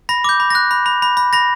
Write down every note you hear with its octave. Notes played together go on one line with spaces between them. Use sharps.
B5 A#6
D6 G6
B5
F#6 A#6
B5
B5
B5
B5
B5 A#6